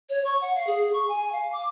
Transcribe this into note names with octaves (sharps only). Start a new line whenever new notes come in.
C#5
C#6
F#5
F5
G#4
C#6
G#5
F5
D6